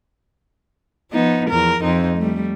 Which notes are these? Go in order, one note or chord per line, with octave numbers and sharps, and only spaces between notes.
F3 B3 D#4
E2 F3 A#4
F2 C4 D#4
G3 A3